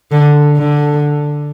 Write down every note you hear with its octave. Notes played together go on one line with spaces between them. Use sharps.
D3
D3